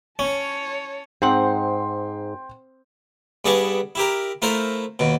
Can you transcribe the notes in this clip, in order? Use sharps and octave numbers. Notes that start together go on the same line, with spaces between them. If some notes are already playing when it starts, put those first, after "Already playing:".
C#4 C#5 A5
G#2 C4 F#5 G5 C6
G2 B3 G#4 D5 A5 C#6
E4 G4 A#4
A3 E4 F4 A#4 C5
D#2 B2